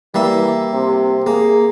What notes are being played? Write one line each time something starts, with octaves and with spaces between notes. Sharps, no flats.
E3 G3 A#3 E5
C3
A#3 G#4